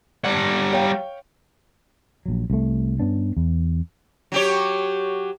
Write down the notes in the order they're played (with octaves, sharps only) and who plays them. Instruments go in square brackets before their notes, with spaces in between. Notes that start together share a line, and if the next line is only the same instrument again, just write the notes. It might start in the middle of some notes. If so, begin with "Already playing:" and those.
[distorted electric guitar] G3 F#5 [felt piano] D5
[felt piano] C#5 F5 G5
[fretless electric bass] A#1 F#3
C2 A3
G2 B3 C#4 D4
E2
[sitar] F#3 G4 C#5